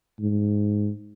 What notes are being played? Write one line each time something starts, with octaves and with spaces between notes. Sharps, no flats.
G#2